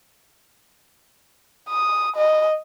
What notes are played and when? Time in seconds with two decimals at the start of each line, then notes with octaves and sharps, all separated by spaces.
1.69 D#6
2.16 D#5